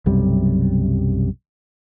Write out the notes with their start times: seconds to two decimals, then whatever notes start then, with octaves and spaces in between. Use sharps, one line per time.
0.06 B1 F#2 C3 G3